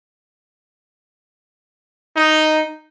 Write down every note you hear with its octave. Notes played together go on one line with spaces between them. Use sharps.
D#4